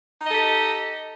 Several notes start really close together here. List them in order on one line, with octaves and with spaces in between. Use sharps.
D#4 D#5 A4 G4